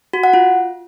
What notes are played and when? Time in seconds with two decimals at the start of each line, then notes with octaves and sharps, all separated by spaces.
0.13 F#4
0.24 F#5
0.34 F4